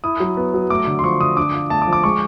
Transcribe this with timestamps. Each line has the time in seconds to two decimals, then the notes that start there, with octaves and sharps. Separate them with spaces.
0.04 E4 D#6
0.20 F#3
0.37 B3
0.54 F#3
0.70 A3 D6
0.87 D3
0.99 C6
1.04 F3 C#6
1.21 D3 D#6
1.37 D4 D6
1.54 F4
1.70 A3 A5
1.82 D6
1.87 F3
1.93 D6
2.04 G#3 C#6